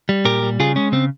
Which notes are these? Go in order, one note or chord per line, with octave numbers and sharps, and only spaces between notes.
G3
A#2 G4 A#4
G3
C#3 F4 G#4
G#3 C#4
C#3 C4